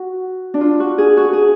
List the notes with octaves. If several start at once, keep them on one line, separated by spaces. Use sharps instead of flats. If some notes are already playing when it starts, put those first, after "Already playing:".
Already playing: F#4
D4
F4
F#4
G#4
F#4
G#4